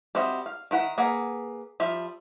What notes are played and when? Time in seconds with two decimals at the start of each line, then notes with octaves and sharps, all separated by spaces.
0.15 G3 C4 F#4 D#5 E5
0.46 F5
0.71 D#3 E4 F#5 B5
0.98 A#3 G#4 B4 F#5
1.80 F3 G3 E5